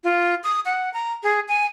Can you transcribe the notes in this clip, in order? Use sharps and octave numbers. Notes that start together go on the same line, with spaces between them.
F4
D#6
F#5
A#5
G#4
G#5